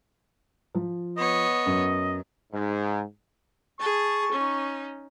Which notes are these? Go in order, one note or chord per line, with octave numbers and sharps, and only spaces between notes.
F3
B3 C#5 D#5
F#2
G#2
G#4 A5 C#6
C#4 D#4